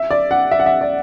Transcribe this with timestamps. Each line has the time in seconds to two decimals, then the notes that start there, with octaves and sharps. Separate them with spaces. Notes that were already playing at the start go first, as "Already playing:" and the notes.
Already playing: E5
0.11 D5
0.31 F#5
0.51 E5
0.60 F#5
0.66 E5
0.81 D5